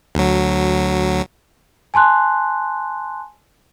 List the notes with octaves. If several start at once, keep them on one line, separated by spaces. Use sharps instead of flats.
D2 F#3
G#5 A5 C6 F#6